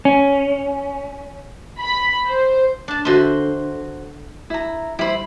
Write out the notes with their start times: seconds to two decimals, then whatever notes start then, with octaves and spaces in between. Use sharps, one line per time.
0.05 C#4
1.81 B5
2.27 C5
2.88 D4 A5
3.05 D3 F#4 C5 E5 C6
4.50 E4 A#5
4.99 G3 E4 C5 B5